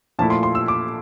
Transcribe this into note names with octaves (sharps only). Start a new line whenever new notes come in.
A#2 F3 A3 E4 A5
C6
C6
E6
D6